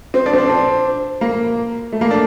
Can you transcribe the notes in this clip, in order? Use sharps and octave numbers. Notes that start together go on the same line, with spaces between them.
C4
D4
C4
D4
C4
A#3
A3
A#3
D4